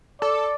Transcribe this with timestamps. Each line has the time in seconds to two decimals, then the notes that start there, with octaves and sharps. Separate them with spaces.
0.22 A4 D5